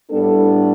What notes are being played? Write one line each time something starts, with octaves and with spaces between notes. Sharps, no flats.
A2 G3 B3 D4 A4